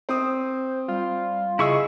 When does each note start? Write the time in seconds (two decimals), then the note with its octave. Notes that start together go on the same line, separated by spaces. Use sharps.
0.09 C4 C5 D#6
0.88 G3 F4
1.59 C#3 E4 G#4 D#5 C#6 E6